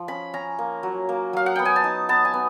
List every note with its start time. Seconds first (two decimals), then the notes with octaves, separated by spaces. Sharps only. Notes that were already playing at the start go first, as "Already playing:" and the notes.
Already playing: F3
0.08 C#4 B5
0.34 C#4 A#5
0.59 A#3
0.83 F#3
1.09 A#3
1.33 F#3 F5
1.46 F#5
1.56 B3 G5
1.65 G#5
1.76 A5
1.84 D#4
2.09 B3 A5
2.25 G#5
2.34 B3